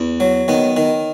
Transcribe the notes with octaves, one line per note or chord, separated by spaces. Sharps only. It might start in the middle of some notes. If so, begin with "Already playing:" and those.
Already playing: E2
F#3
D#3 B3
D#3